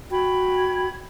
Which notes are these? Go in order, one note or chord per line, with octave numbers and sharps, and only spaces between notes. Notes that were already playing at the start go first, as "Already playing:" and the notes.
F#4 G5 B5 G#6